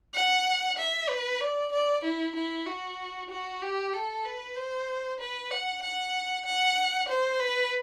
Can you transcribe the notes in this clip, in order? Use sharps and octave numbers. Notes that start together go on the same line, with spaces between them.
F#5
E5
B4
D5
D5
E4
E4
F#4
F#4
G4
A4
B4
C5
B4
F#5
F#5
F#5
C5
B4